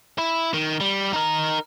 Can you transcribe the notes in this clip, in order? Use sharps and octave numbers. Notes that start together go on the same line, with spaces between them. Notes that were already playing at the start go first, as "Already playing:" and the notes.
E4
D#3
G3
D#4 A#4